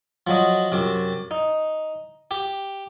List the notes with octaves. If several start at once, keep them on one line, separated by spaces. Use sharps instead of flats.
F3 F#3 D#5
F#2 C3
D#4
G4